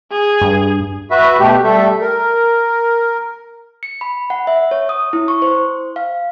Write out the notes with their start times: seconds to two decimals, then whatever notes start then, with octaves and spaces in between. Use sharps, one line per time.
0.11 G#4
0.42 G2
1.11 F#4 B4 E5
1.40 B2 A3 G4
1.64 G3 A3 A4 E5
2.01 A#4
3.83 C#7
4.01 B5
4.30 F#5
4.47 E5
4.71 C#5
4.89 D#6
5.13 E4
5.28 C#6
5.42 C5
5.96 F5